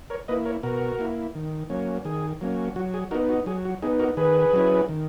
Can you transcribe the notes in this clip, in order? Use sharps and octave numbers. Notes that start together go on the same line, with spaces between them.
A#4 C#5
A#3 E4 B4 D#5
A#4 C#5
B2 F#4 A#4
A#3 E4
D#3
F#3 A#3 C#4
D#3 G#4
F#3 A#3 C#4
F#3 F#4
G#4
B3 D#4 F#4 A#4
F#4
F#3 G#4
F#4
B3 D#4 G#4
F#4 A#4
D#3 G#4 B4
F#3 C#4 E4
D#3